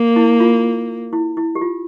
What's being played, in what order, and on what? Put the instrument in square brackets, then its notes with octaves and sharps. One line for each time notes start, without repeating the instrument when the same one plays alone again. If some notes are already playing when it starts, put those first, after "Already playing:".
Already playing: [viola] A#3
[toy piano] E4
F4
E4
E4
G4
F4